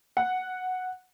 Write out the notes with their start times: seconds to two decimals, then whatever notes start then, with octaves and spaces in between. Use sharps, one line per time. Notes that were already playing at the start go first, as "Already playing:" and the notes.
0.17 F#5